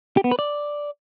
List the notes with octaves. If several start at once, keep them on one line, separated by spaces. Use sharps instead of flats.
G4
B3
B4
D5